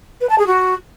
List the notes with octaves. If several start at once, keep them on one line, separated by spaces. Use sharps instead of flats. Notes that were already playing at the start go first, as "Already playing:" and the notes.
B4
A5
G#4
F#4